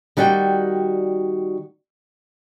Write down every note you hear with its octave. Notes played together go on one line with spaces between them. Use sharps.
D#3 G3 F#4 D5 E5 G5